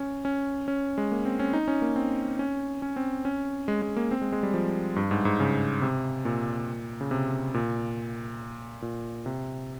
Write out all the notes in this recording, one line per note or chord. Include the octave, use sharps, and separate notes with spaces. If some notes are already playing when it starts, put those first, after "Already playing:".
Already playing: C#4
C#4
C#4
G#3
A#3
C4
C#4
D#4
C#4
A#3
C4
C#4
C#4
C4
C#4
G#3
G#3
A#3
C4
G#3
G#3
G3
F3
G2
G#2
G#2
C#3
C3
A#2
C#3
C3
A#2
A#2
C3